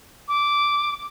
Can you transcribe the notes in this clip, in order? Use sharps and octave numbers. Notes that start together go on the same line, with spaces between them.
D6